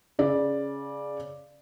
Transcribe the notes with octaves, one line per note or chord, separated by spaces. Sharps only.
C#3 D5